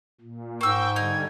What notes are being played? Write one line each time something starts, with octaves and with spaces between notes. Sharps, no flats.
A#2
G#2 A#3 G5 C#6 E6
D3 G3 D#4 G#6